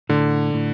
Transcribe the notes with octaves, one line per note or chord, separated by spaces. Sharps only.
A2 D3
A2